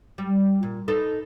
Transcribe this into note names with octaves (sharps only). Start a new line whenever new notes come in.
G3
A#2
D#4 A4 B4